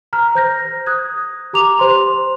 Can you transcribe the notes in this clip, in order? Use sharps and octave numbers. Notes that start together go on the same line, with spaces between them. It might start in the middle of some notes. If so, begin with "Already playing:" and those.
A#5 F6
C5 G6 A#6
D#6 F#6 G#6
G4 A#5 D6 F7
C5 C6